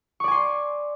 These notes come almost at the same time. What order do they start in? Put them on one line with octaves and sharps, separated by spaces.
C#6 D5 G#5 C6